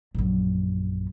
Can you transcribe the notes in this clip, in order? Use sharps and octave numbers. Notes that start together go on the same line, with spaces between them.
A#1 F#2